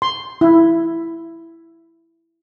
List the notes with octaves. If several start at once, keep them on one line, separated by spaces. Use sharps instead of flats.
C6
E4